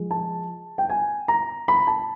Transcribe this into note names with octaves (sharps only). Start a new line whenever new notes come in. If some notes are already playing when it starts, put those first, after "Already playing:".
Already playing: F3 G#3
A5
G5
G#5
A#5
B5
A5